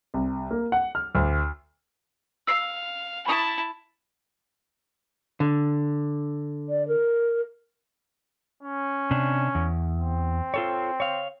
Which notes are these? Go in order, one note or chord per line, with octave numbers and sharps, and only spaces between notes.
C2
A#3
F#5
F6
D2
F5 E6 C7
E4 A5 B5 C#6 D#6
D3
D5
A#4
C#4
C3 D4
E2
C4
F4 A4 C#5
C#5 F5